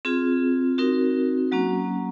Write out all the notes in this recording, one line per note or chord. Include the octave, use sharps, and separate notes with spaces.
C4 F4 G#4
C4 D#4 F#4 A#4
F#3 A#3 C#4 F#4